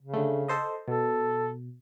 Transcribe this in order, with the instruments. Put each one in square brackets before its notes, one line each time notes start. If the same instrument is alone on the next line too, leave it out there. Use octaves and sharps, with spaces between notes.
[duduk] C#3
[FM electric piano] D3 A3
A4 C5 D#5
[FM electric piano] B2 [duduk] A4